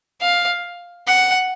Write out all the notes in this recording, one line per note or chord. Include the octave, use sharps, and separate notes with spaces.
F5
F#5